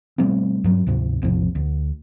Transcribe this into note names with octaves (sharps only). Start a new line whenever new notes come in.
B2 G3 A3 C4
G2 F#3
D2 G#2 C3
A#1 F2 A2 C3
D2